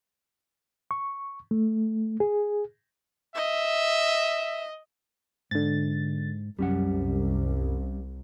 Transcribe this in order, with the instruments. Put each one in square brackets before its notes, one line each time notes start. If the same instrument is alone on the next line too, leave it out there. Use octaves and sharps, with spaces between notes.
[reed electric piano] C#6
A3
G#4
[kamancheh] D#5 [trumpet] E5
[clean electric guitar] G#2 [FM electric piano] D3 A6
[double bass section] C2 [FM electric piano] F#2 [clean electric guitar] G3 C#4 F#5